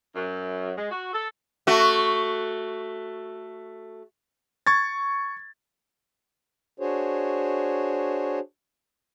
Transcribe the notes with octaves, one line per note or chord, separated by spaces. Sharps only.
F#2
G#3
F#4
A4
A3 F#4
C#6 G#6 A6
D4 F#4 G#4 C5 C#5